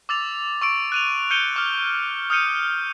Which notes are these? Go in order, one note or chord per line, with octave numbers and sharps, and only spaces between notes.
D6 E6 A6 F7
C#6 E6 D7
F#6 D#7 F7
F6 G6 C#7 D#7 G7
D6 F6
D#6 F6 G6 C#7 D#7